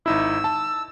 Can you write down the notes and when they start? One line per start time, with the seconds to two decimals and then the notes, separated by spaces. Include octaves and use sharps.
0.06 G#1 D#4 E4 E6
0.44 A5